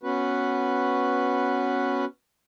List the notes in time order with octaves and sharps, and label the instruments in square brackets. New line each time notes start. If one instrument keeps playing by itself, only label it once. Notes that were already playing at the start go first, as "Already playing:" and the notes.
[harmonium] B3 C#4 F#4 B4